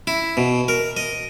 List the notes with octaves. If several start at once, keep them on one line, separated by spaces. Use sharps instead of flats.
E4
B2
A#4
D#5